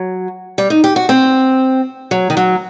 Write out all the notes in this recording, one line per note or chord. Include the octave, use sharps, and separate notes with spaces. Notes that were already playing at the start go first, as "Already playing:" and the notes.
Already playing: F#3
G3
D#4
G4
F#4
C4
F#3
D#3
F#3